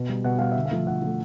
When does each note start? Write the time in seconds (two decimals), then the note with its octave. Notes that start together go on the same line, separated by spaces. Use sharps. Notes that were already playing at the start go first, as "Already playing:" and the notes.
Already playing: B2
0.09 G3
0.24 B2 F#5
0.39 G3 F5
0.52 D3 E5
0.66 F5
0.71 F3 A3
0.87 D3 F#5
1.02 F3 A3